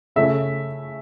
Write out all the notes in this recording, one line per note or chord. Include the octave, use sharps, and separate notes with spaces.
C#3 A3 C#4 E5